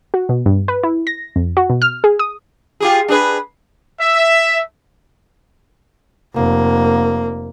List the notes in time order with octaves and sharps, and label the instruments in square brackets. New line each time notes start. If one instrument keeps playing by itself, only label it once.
[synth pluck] F#4
B2
G2
B4
E4
A#6
F2
F#4
B2
F6
G#4
D#6
[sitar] F4 G4 G#4
D4 G#4 B4
[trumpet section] E5
[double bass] F1 A#3